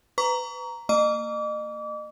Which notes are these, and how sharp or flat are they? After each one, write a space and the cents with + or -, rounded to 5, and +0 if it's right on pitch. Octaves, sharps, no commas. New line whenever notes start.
B4 +25 A#5 +0 C#6 +40
A#3 -25 D#5 -35 D6 -35